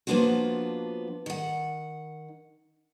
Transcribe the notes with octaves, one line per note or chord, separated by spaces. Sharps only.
F3 A#3 B3 D4 F4 F#4
D#3 F#5